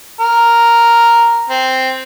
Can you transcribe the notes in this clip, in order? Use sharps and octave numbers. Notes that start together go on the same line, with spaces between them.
A#4
C4